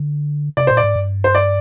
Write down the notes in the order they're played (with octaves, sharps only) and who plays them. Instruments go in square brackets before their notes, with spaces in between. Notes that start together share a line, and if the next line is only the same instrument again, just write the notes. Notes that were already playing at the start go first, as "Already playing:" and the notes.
Already playing: [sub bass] D3
[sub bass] C3 [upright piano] D5
[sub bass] A#2 [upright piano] C5
[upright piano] D5
[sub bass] G#2
G2
[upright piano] C5
D5